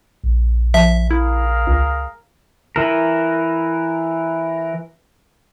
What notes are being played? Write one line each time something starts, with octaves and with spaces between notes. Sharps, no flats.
A#1
F3 E5
E4 G#4 A#4 F5
C#2
E3 A#4